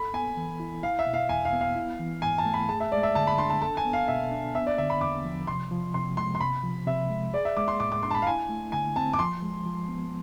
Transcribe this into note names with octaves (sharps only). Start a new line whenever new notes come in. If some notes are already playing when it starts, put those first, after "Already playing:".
Already playing: A4 B5
B3 G#5
E3
E4
E4 F5
E5
B2
F5
E2 G#5
F5
B3
F5
E4
E3
G#2 G#5
A5
A3
B5
G#4 A5
E5
G#3 D5
E5
D3 A5
B5
D4 C6
A5
A4 A5
G#5
B3
F5
B2 E5
D4
B3 E5
D5
D3 E5
B5
E2 D6
F3
C3 C6
F3
C3 C6
G#3 C6
C6
C3 B5
F3
C3 E5
G#3
G#4 D5
E5
G#3 D6
C6
A2 D6
D6
D4 C6
A5
B5
F5
E4 G#5
A3
D3 G#5
C4 A5
D6
F3 C6
G#3
F3
B3